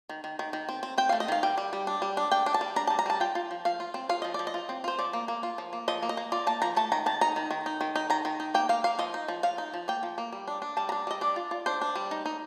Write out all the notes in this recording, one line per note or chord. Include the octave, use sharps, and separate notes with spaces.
D#3
D#3
D#3
D#3
C4
C4
C4 G5
A3 F5
D#5
D#3 F5
G3 G5
G3
G3
D4
G3
D4
D4 G5
D4
A5
G3
D4 A#5
G3 A5
A#5
G3 A5
F4 G5
F4
F3
F3 F5
F4
C4
F4 F5
F3 D#5
F3 D5
D#5
F4
C4
F4 C5
F3 D5
A#3
A#3
F4
F3
A#3
F3 D#5
A#3
D#5
A#3
F4 D5
A#3 A5
F3 A#5
A3 A5
D#3 A#5
D#3 A5
D#4 A#5
D#3
D#3
D#4
D#3
D#4
D#3 A#5
D#3
D#4
A#3 G5
A#3 F5
A#3 F5
F3 D#5
D#4
F3
F3 F5
D#4
F3
A#3 G5
F3
A#3
G3
D4
D4
G3 A5
A#5
D4
G3 D#5
D4 D5
F4
F4
D4 C5
D4
G3
D#4
D#4